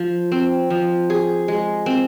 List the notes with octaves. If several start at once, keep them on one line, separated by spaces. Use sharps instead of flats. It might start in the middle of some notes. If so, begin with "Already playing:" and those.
Already playing: F3
C4
F3
G#4
G#3
C4